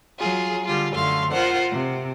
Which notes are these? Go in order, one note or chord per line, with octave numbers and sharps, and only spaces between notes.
F#3 F4 G#4
D3 G3 F4
F#2 D3 A3 F5 C6
F4 A#4 C5 F#5
C3